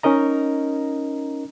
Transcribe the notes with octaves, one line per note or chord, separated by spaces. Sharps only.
C#4 D#4 A#4 D#5 A#5